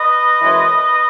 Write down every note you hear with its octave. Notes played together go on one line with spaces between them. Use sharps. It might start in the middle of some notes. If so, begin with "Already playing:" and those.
Already playing: B4 D#5
F#2 E3 G#3